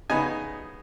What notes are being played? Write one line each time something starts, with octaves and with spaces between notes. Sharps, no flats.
C#3 B3 D#4 D#5 G#5